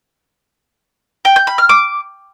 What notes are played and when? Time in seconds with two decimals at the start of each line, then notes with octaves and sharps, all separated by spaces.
1.25 G5
1.36 G6
1.47 B5
1.58 F6
1.69 D6